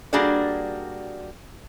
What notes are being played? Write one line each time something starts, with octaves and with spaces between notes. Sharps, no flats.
G3 A#3 D4 F#4 G#4 D5